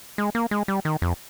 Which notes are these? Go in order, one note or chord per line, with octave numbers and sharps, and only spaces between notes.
G#3
A#3
G#3
G3
D#3
F2